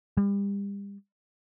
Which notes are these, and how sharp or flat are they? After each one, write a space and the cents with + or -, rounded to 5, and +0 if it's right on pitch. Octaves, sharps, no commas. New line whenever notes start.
G3 +35